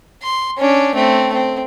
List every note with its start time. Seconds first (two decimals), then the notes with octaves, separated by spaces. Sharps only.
0.23 C6
0.59 C#4 D4
0.95 A3 C4
1.33 C4